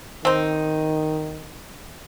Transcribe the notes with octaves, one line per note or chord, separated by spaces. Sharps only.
D#3 C4 D#4